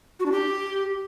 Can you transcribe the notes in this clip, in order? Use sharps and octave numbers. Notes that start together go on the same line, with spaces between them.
F#4
D4
G4